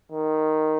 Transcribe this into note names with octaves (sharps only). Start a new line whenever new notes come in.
D#3